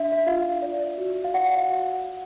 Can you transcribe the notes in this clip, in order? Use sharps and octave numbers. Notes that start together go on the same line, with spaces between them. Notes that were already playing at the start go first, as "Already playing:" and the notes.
Already playing: D4 E5
E5
F4 F5
D5
F#4
F5
D5 F#5
F5
F#4